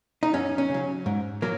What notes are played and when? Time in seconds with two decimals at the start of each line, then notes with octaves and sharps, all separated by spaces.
0.23 D#4
0.33 F#2 C#4
0.58 C#4
0.70 C#3 F#3
1.06 G#2
1.42 F#3 A#3